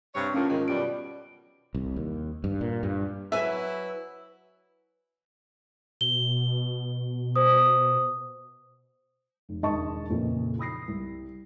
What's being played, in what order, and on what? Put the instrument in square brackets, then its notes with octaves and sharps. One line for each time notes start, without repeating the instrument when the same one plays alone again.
[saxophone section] G2 C3 C#5
[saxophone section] D3 A3 A#3 [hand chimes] C#4 F4
[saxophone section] G#2 D#3
[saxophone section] F#2 B2 G3 [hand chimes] D7
[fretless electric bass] C2
D#2
G2
A#2
G2
[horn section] F#3 E4 [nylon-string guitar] B4 G#5 [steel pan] E5
[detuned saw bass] B2 [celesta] G7
[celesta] C5 D#6
[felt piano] F1
E1 D#3 D#5 A5 C#6
F2 A#2 C#3 E3
B5 D#6 A#6 C7
C2